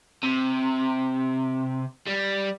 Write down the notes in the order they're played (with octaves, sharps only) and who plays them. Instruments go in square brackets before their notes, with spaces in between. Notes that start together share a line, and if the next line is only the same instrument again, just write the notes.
[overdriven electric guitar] C3
G3